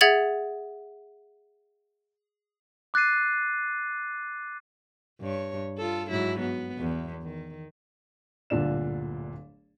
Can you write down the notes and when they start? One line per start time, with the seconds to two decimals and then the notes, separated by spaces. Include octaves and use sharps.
0.01 G#4 E5 F#5 G#6 A6 F#7
2.94 D6 F#6 A6 C7 D#7
5.20 G2 C#5
5.78 F4 A4
6.10 G#2 F#3 E4
6.40 B3
6.78 E2
7.23 D#3
8.50 D1 G1 A#2 D3 D5 E7